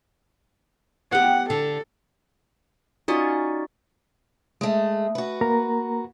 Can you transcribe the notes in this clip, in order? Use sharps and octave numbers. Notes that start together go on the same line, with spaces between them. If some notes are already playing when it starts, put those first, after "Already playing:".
B3 G4 F#5
D3 A4
C#4 D#4 F4 F#4 D5 D#5
G#3 A3
F#4 B4
A#3 A#4 A#5